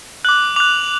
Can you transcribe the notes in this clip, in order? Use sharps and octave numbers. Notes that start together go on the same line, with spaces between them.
D6 F#6 F#7
D6 F#6 F7